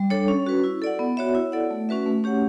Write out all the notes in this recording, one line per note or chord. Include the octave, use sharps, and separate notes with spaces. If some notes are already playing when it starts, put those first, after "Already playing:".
Already playing: G3
D4 A4 C#5
C#4
F#4 B4
E4
A4 D5 F#5
B3
F#4 C#5 E5
E4
A4 D5 F#5
A3
C#4 F#4 B4 E5
A3
C#4 G4 C#5 F#5